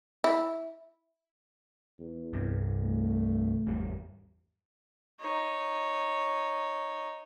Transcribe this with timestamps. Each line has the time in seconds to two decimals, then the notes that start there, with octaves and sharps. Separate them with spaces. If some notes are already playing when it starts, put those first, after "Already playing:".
0.24 E4
1.99 E2
2.33 C2 G2
2.83 A3
3.67 G#1 E2 G3
5.20 D#4 C#5